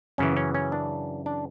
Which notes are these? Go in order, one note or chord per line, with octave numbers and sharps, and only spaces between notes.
F#2 C#3 E3 C#4
C#4
C#4
D4
D4